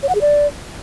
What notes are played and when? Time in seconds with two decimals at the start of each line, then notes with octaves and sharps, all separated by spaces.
0.03 C#5
0.09 F#5
0.15 G#4
0.21 D5